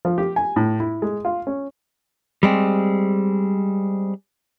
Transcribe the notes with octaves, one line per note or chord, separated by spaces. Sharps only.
F3
G4
G#5
A2
E4
G#3
F4
C#4
G3 G#3 C4